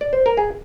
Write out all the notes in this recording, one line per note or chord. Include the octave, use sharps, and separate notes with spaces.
D5
C5
A#4
G#4